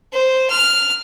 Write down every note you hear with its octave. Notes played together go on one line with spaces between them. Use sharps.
C5
F6